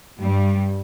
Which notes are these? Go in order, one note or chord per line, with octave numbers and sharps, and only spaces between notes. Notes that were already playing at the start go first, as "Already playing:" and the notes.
G2 G3